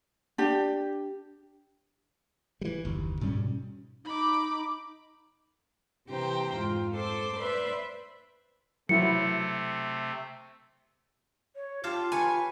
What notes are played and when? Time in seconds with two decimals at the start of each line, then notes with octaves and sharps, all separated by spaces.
0.38 D4 G4
2.61 E3 G3
2.85 F#1 D#2
3.21 G#2 B2 G3 C#4
4.05 D#4 B5 D6
6.07 C3 E3 G4 C5 G5 A#5
6.57 F2 G#2 F4
6.94 A4 C5 C6 D6
7.38 B4 C5 D5 E5 B5 C6
8.89 C3 F#3 A3 E4 C#7
11.56 C#5
11.84 F4 G4 F5 A5
12.12 B4 C#5 G#5